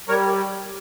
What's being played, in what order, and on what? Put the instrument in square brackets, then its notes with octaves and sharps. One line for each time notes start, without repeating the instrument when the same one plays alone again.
[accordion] G3 A#4 C#5